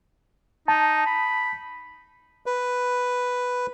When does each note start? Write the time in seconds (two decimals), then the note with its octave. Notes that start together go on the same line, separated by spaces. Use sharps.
0.68 D#4 A5
1.06 B5
2.46 B4